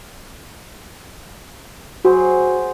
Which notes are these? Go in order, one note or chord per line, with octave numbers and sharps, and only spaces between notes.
F#3 F#4 G#4 C5